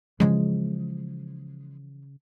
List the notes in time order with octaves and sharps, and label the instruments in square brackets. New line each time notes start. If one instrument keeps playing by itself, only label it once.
[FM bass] C#3 [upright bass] E3 F3 [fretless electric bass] G#3